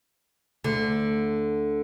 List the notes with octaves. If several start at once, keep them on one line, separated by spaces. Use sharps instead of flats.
D2 D3